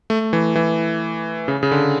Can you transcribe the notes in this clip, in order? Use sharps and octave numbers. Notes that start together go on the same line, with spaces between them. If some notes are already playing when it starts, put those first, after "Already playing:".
A3
E3
E3
C#3
C#3
D3